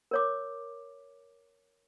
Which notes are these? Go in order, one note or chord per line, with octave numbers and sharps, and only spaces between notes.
A#4 C#5 D6